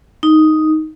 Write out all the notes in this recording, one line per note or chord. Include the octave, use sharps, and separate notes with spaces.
D#4